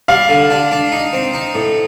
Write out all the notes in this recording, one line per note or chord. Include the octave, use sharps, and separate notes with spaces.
G3 F5
D3
D4
D4
D#4
C4
D#4
A2